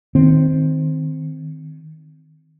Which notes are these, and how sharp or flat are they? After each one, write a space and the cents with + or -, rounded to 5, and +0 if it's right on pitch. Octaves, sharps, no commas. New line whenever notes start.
D#3 +0 C4 -10